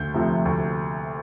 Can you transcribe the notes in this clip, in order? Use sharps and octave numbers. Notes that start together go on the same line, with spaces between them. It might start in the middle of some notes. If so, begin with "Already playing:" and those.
Already playing: D2 G6
C3 F3 A3
D2